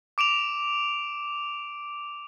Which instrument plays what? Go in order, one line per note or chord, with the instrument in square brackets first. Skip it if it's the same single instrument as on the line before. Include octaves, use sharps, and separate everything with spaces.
[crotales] D6 D7 E7 F7